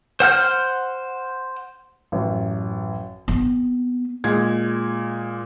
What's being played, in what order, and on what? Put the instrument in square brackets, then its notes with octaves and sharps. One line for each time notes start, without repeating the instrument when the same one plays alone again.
[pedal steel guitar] C5 F#5 F6 G6
[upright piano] A1 F#2
[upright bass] B3 C4
[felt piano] A#2 G#3 G#6